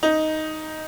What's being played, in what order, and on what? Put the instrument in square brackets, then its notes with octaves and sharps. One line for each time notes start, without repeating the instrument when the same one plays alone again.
[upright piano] D#4